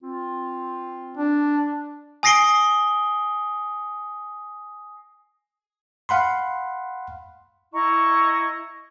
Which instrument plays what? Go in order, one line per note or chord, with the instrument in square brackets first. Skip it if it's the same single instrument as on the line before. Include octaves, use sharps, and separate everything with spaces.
[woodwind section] C4 F4
[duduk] D4
[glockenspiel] G#5 D#6 A#6 C7 D7 G7
[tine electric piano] F5 F#5 B5 C6
[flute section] E4 D#5 A#5 C#6